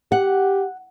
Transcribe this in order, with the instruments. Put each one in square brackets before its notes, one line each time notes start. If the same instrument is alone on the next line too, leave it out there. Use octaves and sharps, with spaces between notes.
[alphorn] G4 [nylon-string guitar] F#5